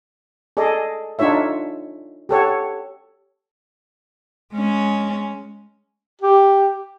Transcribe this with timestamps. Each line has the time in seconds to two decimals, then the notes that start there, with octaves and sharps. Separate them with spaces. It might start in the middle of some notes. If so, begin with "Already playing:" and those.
0.57 G#4 A4 D5 D#5
1.19 D4 D#4 F4 C#5 E5
2.29 G4 A4 C#5 F#5
4.54 G#3 C#4
6.21 G4